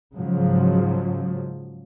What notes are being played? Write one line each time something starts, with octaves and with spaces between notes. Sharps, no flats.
G#2 C#3 F3 F#3